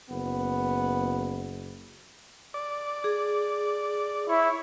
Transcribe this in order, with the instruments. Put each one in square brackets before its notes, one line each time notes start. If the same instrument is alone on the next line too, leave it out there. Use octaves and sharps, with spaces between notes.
[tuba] F#1 [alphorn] B3
[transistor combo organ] D5
[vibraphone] G#4
[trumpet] E4 [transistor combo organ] C#5